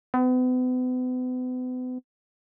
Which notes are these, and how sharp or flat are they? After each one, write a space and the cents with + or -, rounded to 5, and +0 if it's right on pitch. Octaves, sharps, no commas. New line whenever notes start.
B3 +40